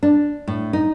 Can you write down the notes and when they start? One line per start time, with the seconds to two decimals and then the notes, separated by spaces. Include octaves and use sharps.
0.03 D4
0.48 A2
0.73 D#4